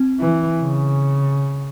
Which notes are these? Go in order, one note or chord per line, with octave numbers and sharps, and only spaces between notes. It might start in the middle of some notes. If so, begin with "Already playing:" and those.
Already playing: C4
E3
C#3